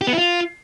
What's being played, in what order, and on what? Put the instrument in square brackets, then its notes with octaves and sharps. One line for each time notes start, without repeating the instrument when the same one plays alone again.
[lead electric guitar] G4
B3
E4
F4